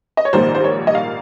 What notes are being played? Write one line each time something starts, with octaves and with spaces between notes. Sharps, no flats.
D#5
C#5
A#1 G#2 D#3 G3 A#3 C5
C5
C#5
D#5
F5